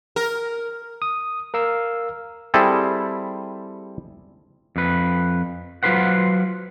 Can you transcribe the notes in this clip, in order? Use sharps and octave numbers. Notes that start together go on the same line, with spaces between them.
A#4
D#6
A#4 F5 E6
G3 C4 E4 G#4 A4
F2 B4
F#3 F4 B4 C5 F#5